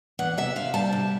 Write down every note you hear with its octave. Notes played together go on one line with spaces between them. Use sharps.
E2 F#5
C3 E5
C3 F5
G3 A5
C3